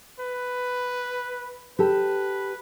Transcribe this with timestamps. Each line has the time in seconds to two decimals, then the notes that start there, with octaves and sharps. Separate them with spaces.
0.20 B4
1.79 G4 A4 B4